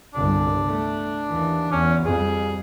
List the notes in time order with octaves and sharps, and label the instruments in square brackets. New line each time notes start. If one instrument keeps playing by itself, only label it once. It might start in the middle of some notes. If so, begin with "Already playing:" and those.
[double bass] G1 C2 [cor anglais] D4
[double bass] A3
D#2 E3
[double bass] E2 [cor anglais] C#4
[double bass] F2 G3 [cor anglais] G#4